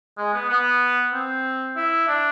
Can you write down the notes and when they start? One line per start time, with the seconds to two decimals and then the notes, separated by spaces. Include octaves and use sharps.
0.18 G#3
0.34 B3
0.50 B3
1.14 C4
1.76 E4
2.08 D4